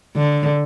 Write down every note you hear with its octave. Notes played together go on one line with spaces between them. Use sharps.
D3